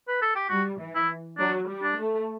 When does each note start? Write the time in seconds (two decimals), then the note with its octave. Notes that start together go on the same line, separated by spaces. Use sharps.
0.08 B4
0.22 A4
0.36 G4
0.49 G3 F#4
0.80 E3
0.95 E4
1.38 F#3 D4
1.68 G3
1.83 D4
1.97 A3